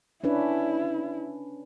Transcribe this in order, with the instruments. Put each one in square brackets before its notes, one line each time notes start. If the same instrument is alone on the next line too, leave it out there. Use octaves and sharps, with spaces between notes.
[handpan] C#4 D4 B4 [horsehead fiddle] E4